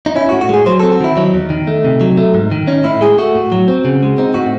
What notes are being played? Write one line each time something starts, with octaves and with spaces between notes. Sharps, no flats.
D#4
C#4 E4
F#4
A2
F#4
G#3 G#4
F#3 C5
C4 A4
F#4
D#3 E4
F#3 D#4
E2
D#3
A3
C3
F#3
A3
G#2
D#3
C#4 D#4
A2 E4
G#3 G#4
A3 F#4
A2
F#3
C4
C#3
G#3
C4 D#4
A2 F#4